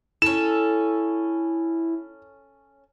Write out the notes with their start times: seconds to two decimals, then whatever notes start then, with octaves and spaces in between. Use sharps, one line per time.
0.22 C#4 E4 A4 E7